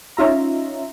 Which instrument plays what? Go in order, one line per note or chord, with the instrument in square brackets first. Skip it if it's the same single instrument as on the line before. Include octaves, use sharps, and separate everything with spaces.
[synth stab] C#4 D#4 F4 E5 A#5